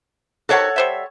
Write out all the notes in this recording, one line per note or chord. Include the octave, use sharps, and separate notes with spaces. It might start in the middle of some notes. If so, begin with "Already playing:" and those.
C3 D#3 F#4 A4 C#5 F#5
G3 C5 E5